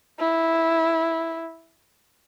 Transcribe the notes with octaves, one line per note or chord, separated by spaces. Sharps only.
E4